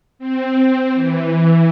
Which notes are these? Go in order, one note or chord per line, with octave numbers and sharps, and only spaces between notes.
C4
E3